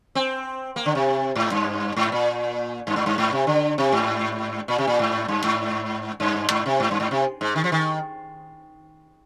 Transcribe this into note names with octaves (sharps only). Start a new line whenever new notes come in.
C4
A#3
D3
C3
G#2
G2
G#2
A#2
G2
G#2
G2
G#2
C3
D3
C3
G#2
A#2
C3
A#2
G#2
G2
G#2
G2
G#2
C3
G#2
G2
G#2
C3
G#2
D#3
F3
D#3